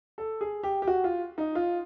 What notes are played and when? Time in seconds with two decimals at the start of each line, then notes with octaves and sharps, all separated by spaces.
0.18 A4
0.41 G#4
0.63 G4
0.82 G4
0.87 F#4
1.04 F4
1.38 D#4
1.55 F4